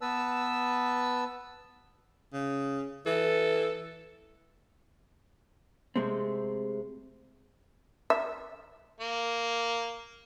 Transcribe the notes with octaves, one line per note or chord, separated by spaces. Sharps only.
B3 B4 A5 E6
C#3
E3 A4
C3 G#3 A3 C4
E5
A#3